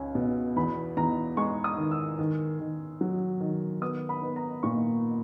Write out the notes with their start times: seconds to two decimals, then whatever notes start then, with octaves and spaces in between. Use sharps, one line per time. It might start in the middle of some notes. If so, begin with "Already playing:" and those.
Already playing: C#2 C#4
0.15 B2
0.56 E2 B5
0.97 E2 A#5
1.37 G#3 C#6
1.64 D#6
1.78 D#3
1.91 E6
2.19 D#3
2.60 D#3
3.01 F#3
3.40 D#3
3.81 B3 D#6
4.09 B5
4.23 B3
4.36 A#5
4.63 A#2 C#6